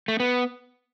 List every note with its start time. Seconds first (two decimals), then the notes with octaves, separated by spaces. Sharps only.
0.08 A3
0.20 B3